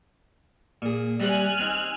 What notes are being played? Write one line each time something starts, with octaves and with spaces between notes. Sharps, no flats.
A#2 G#4
C3 G3 G#5 F6 F#6
C4 D#4